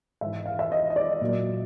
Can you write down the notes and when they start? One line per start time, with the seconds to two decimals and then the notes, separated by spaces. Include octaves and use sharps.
0.21 G#2 E3 E5
0.46 F5
0.59 E5
0.72 D#5
0.90 D#5
0.96 D5
1.21 A#2 F#3